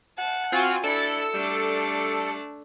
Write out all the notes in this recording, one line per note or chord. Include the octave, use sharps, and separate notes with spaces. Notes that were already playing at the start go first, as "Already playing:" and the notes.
F#5 A5
C4 F4 F#4 G#5
D4 E4 A4 C#7
G3 A3 D4